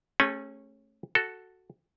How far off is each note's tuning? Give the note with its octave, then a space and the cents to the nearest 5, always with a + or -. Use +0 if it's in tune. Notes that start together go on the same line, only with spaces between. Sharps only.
A3 +0 C#4 -20 G#4 -35
F#4 +0 A4 +0